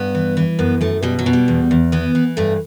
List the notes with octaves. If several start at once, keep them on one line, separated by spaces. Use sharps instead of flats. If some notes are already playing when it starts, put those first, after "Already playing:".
Already playing: G2 B3
E3
E3
F#2 B3
F#2 A3
B2 G3
F#3
B2
G3
E2
E2
E3 B3
E3
G2 A3